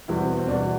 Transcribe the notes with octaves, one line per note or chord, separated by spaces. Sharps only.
E2 B2 G3 E4
C4
B3
C4
E2 B2 G3 D4